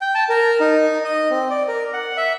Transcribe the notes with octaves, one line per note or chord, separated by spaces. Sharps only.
G5
A5
A#4
D#4
D#5
C4
D5
A#4
F#5
E5